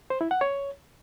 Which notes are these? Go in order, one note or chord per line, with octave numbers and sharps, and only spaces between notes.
C5
E4
F#5
C#5